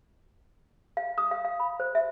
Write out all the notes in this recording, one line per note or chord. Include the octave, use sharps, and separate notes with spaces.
F5
D#6
F5
F5
B5
C5
E5